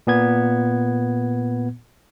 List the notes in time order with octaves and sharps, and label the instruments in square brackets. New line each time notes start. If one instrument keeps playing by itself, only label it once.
[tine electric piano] A#2 B3 G#6